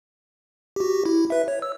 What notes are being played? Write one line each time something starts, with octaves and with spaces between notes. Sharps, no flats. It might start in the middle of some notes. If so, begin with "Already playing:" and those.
F#4 G4
E4
B4 E5
C#5
E6